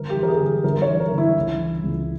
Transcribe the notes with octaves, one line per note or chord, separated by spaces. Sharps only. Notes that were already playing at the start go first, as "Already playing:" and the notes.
Already playing: G1 A#4
G4
E3
A#4
G#4
G1
G#4
G1 A#4
C#5
E3
A#4
G1
E4
C#2
E3
C#2